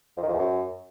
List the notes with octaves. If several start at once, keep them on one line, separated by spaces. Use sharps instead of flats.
F2
D#3
F2
E2
F#2